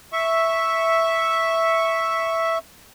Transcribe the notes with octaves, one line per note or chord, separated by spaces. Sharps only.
E5 C#6